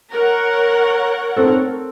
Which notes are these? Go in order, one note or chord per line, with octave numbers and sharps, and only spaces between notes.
A#4 C#5 F#5
C4 A4